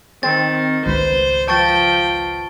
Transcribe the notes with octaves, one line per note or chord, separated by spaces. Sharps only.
D#3 C4 A6
G#1 C#2 B4 C5
F3 G5 A5 C#6 A6